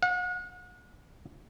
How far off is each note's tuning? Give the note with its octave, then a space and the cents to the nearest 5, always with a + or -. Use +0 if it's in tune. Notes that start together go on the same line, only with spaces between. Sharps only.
F#5 -40